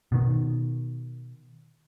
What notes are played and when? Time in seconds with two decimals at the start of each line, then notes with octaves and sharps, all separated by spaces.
0.12 B2 D#3